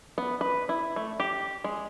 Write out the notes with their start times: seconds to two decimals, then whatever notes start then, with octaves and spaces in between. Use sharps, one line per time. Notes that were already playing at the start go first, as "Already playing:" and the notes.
0.18 B3
0.41 B4
0.69 E4
0.96 A3
1.20 G4
1.64 G#3